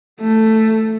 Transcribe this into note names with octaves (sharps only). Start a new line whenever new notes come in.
A3